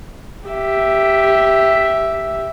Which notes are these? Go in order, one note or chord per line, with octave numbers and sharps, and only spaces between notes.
G4 E5